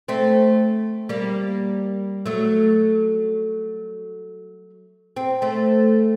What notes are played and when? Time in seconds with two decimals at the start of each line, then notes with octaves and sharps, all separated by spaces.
0.08 A3 C4
1.09 G3 A#3
2.26 F#3 A3
5.16 C4
5.42 A3 C4